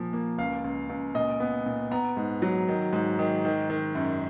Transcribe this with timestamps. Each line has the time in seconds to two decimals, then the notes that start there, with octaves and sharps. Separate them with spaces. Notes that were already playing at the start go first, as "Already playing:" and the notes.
Already playing: A#2 F3
0.13 A#3
0.38 C#2 F5
0.64 C#2
0.90 C#2
1.15 A#2 D#5
1.40 B3
1.66 A#2
1.91 B3 A#5
2.17 G#2
2.42 F#3
2.68 D#3
2.93 G#2
3.19 D#3
3.45 D#3
3.70 D#3
3.95 F#2